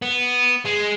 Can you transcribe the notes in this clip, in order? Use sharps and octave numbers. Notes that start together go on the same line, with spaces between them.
B3
G#3